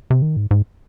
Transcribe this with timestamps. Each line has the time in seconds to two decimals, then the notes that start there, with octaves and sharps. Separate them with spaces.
0.10 C3
0.22 D#3
0.37 G#2
0.51 G#2